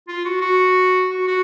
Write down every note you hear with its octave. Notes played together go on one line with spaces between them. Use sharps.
F4
F#4
F#4
F#4
F#4